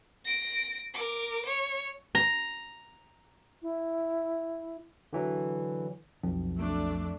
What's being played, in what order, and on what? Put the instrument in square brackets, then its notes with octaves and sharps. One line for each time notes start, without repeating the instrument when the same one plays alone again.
[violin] A#6 D7
A#4 D6
C#5
[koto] A#5
[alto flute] E4
[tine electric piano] D3 E3 F#3
[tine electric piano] B1 [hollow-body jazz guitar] F2
[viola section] A3 D4